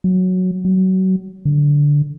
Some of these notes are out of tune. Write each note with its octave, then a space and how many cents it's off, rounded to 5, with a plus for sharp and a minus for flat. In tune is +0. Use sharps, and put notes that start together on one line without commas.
F#3 -5
F#3 +25
D3 -10